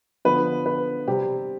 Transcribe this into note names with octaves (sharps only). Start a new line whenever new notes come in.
D3 F3 B3 B4
B4
C3 G3 C4 G4